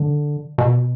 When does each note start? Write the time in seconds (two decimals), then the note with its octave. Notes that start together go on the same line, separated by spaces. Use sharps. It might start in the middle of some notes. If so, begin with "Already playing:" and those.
Already playing: D3
0.58 B2